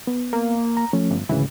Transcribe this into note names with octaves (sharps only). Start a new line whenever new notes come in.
B3
A#3
A#5
F3 A3 C#4
G1
D2 G#2 C#3 E3